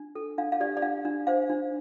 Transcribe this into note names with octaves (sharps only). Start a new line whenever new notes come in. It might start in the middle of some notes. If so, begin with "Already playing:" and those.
Already playing: D4
A4
D4 F5
F5
G4 D5
D5
D4 F5
D4
C5 F5
D4